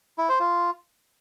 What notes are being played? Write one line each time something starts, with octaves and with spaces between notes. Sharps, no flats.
E4
C5
F4